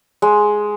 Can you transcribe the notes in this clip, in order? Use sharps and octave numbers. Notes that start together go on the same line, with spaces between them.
G#3